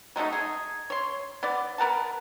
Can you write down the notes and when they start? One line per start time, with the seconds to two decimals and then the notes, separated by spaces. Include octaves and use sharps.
0.16 F#3 G#3 A3 D#4
0.32 G#4
0.90 C#5 C6
1.43 B3 D5
1.78 B3 A#4 F#5 A5